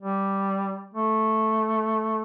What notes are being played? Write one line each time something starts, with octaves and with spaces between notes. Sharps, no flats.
G3
A3